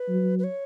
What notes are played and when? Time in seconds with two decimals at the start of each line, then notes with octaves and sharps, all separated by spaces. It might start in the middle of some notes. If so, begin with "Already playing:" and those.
Already playing: B4
0.09 F#3
0.39 B4
0.44 C#5